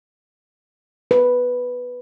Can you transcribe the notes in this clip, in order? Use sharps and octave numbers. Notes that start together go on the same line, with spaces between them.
B4